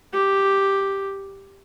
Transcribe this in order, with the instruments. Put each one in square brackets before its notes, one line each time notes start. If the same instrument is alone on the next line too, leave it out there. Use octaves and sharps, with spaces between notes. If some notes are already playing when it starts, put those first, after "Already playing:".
[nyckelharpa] G4